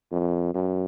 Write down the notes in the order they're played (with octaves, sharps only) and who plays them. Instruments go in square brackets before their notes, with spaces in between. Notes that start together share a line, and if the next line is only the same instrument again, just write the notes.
[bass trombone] F2
F#2